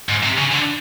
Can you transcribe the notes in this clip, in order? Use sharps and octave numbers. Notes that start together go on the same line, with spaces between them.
G#2
C3
C#3
D3